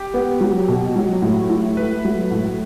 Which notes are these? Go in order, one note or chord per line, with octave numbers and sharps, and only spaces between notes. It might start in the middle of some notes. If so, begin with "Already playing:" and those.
Already playing: G4
B3
F#3
B2
F#3
A2
E4
A3 B4
F#3
A2